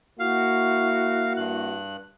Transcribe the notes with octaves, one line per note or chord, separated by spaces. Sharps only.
A#3 E4 F#4 F5
G2 F#6